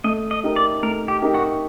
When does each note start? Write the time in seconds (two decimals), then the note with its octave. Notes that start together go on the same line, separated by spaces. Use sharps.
0.04 A3 D#5
0.31 D#5
0.43 D#4 G4 A#4
0.56 D5
0.83 A3 A#4
1.08 G4
1.22 D#4 G4 A#4
1.34 F#4